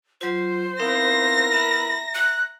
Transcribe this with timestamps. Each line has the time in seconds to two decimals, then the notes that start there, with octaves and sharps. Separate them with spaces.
0.21 F#3 F4 C5
0.80 B3 C4 D#4 E4 A#4 F5 A#6
1.52 E5 A#5 B5
2.15 F#6